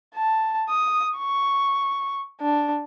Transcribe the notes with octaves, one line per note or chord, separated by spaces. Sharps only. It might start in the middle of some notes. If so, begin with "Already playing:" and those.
A5
D#6
C#6
D4